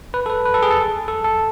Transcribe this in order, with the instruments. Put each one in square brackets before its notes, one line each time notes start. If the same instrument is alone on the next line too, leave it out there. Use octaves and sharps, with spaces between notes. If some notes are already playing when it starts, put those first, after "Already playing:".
[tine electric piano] B4
A4
B4
B4
A4
G#4
A4
A4
A4